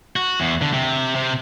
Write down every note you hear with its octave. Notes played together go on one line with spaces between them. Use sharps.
F#4
E2
D3
C3
C3